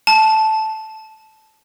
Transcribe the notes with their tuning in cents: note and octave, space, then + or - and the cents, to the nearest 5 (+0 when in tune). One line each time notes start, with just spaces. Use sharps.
A5 -10